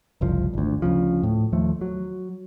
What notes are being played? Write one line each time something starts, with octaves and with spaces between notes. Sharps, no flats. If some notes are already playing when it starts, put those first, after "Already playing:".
F#1 C2 F3
G#1 D2
D2 C#3 F3
A2
D#2 F3 A3
F#3